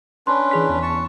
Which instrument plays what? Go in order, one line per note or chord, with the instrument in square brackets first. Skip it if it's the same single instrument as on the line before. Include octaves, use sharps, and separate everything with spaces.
[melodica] C#4 D4 B4 [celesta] C6
[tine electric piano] E3 G#4 B6
E2
[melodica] A5 C#6